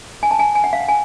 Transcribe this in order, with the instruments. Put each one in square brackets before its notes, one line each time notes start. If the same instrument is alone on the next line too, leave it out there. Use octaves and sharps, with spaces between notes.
[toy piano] G#5
A5
G#5
G#5
F#5
F5
F#5
G#5